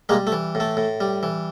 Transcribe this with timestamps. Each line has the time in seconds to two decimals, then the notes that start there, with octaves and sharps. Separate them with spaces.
0.09 G3 G#3 A#3
0.27 A3
0.32 E3
0.55 A2
0.60 A3
0.77 A2
1.00 G3
1.23 E3